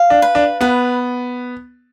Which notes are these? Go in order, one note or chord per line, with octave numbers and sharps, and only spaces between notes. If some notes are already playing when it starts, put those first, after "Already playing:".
Already playing: F5
D4
B4
D4
B3 B4